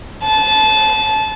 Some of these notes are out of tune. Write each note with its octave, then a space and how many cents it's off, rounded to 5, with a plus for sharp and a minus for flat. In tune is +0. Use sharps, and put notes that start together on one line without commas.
A5 -25